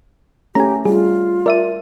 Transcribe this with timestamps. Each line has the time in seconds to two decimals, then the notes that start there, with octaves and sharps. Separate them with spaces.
0.55 A3 C#4 G4 G#5 A#5
0.85 G3 F4 G#4
1.46 A#4 D5 E5 D#7